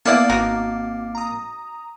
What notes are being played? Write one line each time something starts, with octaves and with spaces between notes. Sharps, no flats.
A#3 B3 E4 D5 F#5 A5
G#1 D#4 F#4 A#4 D6
A#5 D#6